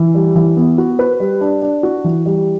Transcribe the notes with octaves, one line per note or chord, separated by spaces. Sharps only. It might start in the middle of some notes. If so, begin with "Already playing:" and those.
Already playing: E3
G3
E3
B3
F#4
B4
G3
D4
D4
F#4
E3
G3